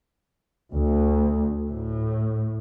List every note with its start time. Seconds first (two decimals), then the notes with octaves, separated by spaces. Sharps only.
0.73 D2
1.72 A2